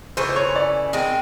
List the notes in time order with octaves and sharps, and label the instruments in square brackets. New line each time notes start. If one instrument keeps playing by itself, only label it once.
[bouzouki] C#3 E3 A3 [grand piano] C5
[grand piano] C5
C#5
D5
[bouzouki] D#3 G#3 C4 [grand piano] D#5